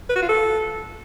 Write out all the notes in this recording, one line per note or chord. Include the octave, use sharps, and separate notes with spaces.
B4
F#4
F4
A4